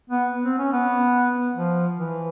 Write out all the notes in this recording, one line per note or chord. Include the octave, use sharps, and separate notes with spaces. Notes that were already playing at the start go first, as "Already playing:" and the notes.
B3
C4
C#4
B3
F3
E3